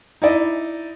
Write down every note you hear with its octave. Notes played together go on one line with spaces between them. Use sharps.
D#4 E4 D5 D#5